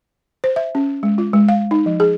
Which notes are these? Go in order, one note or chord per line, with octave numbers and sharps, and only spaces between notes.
C5
E5
C#4
G#3
F4
G#3
F5
D#4
F3
G#4